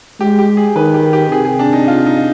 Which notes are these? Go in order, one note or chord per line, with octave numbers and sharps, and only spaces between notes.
G#3 G4
G4
G#4
D#3 B4
G4
G4
C3 G#4
G#4
D4
D#4
F4
D#4